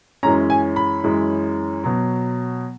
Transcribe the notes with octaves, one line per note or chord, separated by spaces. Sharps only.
F#2 E3 G#3 C#4 A#5
G#5
B5
F#2 E3 G#3 C#4
B2 F#3